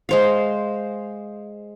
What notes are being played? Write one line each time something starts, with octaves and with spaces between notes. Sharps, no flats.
G#3 C5 F5